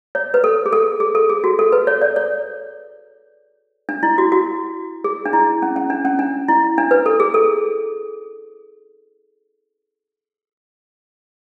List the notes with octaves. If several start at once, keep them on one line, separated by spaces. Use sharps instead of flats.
C#5
B4
A4
G#4
A4
G#4
A4
G#4
F#4
A4
B4
C#5
D5
C#5
D4
E4
F#4
F#4
G#4
D4
E4
C#4
C#4
D4
C#4
D4
E4
D4
B4
A4
G#4
A4